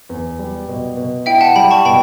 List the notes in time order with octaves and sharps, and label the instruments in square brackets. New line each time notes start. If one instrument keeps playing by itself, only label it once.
[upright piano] E2
G3
B2
B2
[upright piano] E4 [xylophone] E5 G5
[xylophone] F#5 A5
[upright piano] G3 [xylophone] G5 B5
[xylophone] A5 C#6
[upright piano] B2 [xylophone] G5 B5